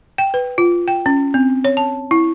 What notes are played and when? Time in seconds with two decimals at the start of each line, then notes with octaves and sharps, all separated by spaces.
0.18 G5
0.34 B4
0.58 F4
0.88 G5
1.06 C#4
1.34 C4
1.65 C#5
1.77 A5
2.11 E4